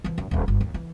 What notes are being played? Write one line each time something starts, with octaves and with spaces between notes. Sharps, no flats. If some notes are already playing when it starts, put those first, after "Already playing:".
E3 F3
F#2
D1 C#4
G1
D#2
E3